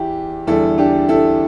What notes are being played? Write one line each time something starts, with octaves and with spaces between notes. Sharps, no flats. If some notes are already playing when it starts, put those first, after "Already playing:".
Already playing: E2 E4 G4
E2 D3 G3 E4 A4
D4 G4
E4 A4